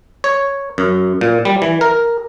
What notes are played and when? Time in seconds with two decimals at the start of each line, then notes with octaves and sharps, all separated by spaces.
0.24 C#5
0.78 F#2
1.21 A#2
1.45 G3
1.62 E3
1.81 A#4